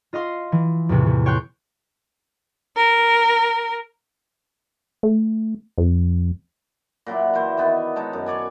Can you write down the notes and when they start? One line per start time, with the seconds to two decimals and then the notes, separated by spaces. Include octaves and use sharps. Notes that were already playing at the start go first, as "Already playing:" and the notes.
0.13 F4 D#5 F5 C6
0.52 E3
0.89 E2 A2 C3 E3
1.06 C3
1.26 C#5 G5 C6 F#6 G6
2.77 A#4
5.03 A3
5.78 F2
7.06 A#2 F#3 E4 D5
7.34 E3 E4 C5
7.58 D#3 B3 E4
7.96 G#3 D#4 C#5 A5
8.13 F#2
8.26 C#5 D5 G#5